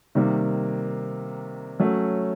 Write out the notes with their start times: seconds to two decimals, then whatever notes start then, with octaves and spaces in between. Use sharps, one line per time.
0.15 C3 D#3 G3 A#3
1.80 F#3 A3 C#4